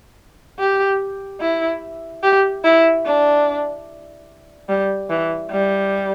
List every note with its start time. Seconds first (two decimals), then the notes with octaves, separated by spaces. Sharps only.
0.59 G4
1.40 E4
2.23 G4
2.64 E4
3.06 D4
4.69 G3
5.10 E3
5.51 G3